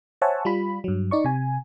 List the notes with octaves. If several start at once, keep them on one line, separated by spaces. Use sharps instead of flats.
C5 C#5 E5 F#5 G#5 A5
G3 F4 B5
G2 F#3
D#4 D5 C#6
C3 G#5